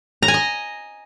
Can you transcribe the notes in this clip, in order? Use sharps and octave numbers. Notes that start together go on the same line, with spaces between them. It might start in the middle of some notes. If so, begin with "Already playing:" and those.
A#5
G#5
D#5